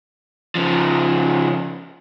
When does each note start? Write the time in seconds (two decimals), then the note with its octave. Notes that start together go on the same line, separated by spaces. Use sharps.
0.55 C#3 F3